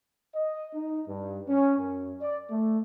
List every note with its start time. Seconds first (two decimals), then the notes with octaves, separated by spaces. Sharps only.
0.35 D#5
0.74 D#4
1.08 G2
1.48 C#4
1.79 F#2
2.22 D5
2.50 A3